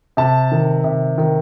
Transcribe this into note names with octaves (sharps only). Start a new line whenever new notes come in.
C3 A5
D#3
C3
D#3